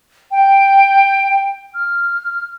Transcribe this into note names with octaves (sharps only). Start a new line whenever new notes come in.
G5
F6